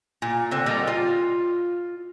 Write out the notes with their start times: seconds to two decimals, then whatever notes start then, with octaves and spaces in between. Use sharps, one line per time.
0.22 A#2
0.51 D3 C4
0.66 A#2 G3 D#4 A#5
0.87 F4